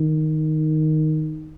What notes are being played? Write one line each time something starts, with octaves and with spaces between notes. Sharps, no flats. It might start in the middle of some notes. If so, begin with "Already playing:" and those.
Already playing: D#3